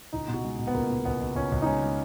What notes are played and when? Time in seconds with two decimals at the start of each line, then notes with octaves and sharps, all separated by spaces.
0.13 C#2 D#4
0.28 B2
0.34 F#4
0.44 G#3
0.59 B2
0.67 B3
0.75 C#2 A#3
0.90 B2
1.05 C#2 B3
1.21 C#2
1.35 C#2 C#4
1.52 C#2
1.62 D#4
1.66 G#3 C#4
1.82 G#3